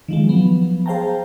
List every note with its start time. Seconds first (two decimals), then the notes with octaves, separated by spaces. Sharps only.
0.08 D#3 F3 G#3
0.29 F3 F#3 B3
0.86 G#4 C5 F5 G5 A5 A#5